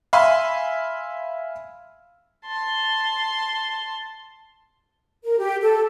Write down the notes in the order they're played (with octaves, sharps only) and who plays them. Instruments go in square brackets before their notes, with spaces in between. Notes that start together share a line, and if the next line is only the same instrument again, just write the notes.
[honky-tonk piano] E5 F5 G#5 B5 C6
[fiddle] A5 C6
[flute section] A#4
G4
A4